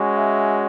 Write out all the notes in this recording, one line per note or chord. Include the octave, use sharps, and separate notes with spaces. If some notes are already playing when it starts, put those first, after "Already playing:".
Already playing: G#3 C#4 F#4
E5